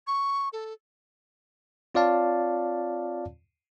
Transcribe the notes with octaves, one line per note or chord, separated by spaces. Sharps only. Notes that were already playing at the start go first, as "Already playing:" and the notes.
C#6
A4
C4 F4 C#5 D5 F5 A5